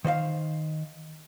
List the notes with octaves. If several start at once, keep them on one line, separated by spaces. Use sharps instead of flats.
D#3 C5 D#5 F5